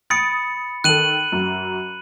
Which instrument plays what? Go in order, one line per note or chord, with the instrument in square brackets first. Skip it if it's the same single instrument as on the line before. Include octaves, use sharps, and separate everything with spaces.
[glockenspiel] B5 C#7 [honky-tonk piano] D#6 A6 D7
[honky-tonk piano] D#3 A4 [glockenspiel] F#6 D#7 F#7
[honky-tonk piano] F#2